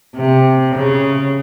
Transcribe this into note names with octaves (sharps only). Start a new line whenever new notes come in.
C3
C#3